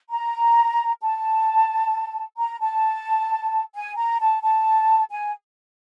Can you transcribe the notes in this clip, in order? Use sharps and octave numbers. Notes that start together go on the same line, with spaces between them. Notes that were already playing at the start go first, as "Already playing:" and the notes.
A#5
A5
A#5
A5
G#5
A#5
A5
A5
G#5